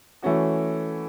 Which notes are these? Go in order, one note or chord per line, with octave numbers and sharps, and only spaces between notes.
E3 A3 C#4 F#4